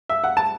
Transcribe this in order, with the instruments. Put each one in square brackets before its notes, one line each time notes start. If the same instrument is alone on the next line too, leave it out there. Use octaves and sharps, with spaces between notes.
[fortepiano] E5
F#5
A5